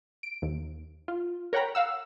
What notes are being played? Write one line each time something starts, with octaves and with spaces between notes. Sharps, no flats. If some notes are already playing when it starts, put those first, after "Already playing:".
D7
D#2
F4
A#4 C#5 F#5 G5 A#5 B5
F5 F#5 E6